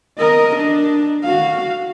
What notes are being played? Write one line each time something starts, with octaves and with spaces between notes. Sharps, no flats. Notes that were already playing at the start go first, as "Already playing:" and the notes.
A#4 D#5
D4
F#4 F5